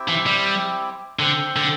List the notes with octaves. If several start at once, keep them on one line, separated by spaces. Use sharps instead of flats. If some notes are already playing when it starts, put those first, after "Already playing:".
Already playing: C4 E4 G4 E5 G5
E3
G3
D3 C4 A4 C5 G5
D3